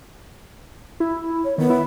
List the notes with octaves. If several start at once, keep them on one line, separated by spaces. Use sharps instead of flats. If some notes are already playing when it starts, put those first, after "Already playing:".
E4
C#5
D#3 B3
E4